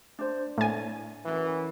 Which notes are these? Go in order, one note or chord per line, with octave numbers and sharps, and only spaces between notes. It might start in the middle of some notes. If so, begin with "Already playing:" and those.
D4 C5
A2 G#5
F#2 E3